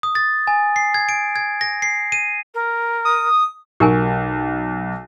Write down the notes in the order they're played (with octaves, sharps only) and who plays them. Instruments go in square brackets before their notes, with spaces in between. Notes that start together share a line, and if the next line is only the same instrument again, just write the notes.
[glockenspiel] D#6
A6
G#5
C7
G#6
D7
G#6
A#6
C7
D#7
[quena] A#4
[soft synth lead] D#6
[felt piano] B1 [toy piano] G4 A#4 G#5